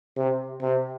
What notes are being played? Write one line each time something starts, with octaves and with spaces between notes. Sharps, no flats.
C3
C3